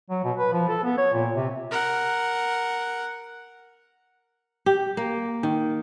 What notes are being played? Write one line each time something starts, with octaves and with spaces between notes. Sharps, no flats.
F#3
B2
B4
F3
A4
B3
C#5
A#2
C3
A#4 F#5
G4
A#3
D#3